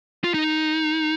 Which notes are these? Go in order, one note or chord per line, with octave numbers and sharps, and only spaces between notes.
F4
D#4